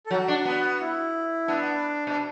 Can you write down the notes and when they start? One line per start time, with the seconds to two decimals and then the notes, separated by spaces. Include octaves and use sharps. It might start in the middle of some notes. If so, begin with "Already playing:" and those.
0.06 A4
0.11 F#3 F#4
0.28 D4
0.45 B3
0.80 E4
1.48 B3 D4
2.07 B2 D4